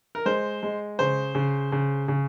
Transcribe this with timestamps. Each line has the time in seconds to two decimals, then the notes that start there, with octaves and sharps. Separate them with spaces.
0.15 A#4
0.25 G#3 C5
0.63 G#3
0.99 C#3 C5
1.35 C#3
1.72 C#3
2.08 C#3